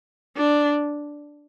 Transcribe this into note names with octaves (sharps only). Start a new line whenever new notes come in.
D4